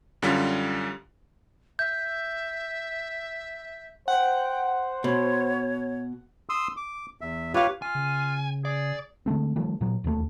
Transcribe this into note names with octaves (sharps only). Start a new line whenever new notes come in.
F#2 D3 G3 C#4 F4 B6
E5 G6
C5 F#5 G5
B2 C#5
C6 D#6 E6
D6
E2 E5
F4 G4 B4 C#5 F5
F4 G#5
C#3
G#4 D5
D3 G#3 A3 C4
D#3 F3 G3 A3
A#2 F#3
E1 D#2 F3 A3